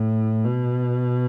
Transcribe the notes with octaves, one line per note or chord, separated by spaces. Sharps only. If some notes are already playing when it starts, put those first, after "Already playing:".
Already playing: A2
B2